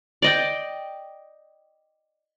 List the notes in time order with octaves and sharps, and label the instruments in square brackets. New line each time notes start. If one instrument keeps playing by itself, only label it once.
[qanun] D5 D#5 G5